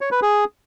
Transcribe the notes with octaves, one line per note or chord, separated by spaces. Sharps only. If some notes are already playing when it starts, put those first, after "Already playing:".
C#5
B4
G#4